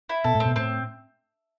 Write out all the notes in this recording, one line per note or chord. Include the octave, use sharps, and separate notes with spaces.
E4
B2 A4
A2
C4
B2
A2 C4